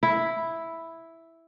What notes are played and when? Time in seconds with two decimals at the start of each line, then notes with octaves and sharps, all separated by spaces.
0.03 E4